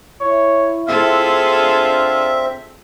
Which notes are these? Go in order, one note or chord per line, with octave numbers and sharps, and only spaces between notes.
E4 C#5
C4 F4 G#4 A4 E5 F5
D4